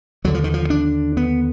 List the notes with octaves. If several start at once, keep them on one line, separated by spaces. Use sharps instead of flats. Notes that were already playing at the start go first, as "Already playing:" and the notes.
D#2 D3 F#3
F3
D#3
F3
D4
B3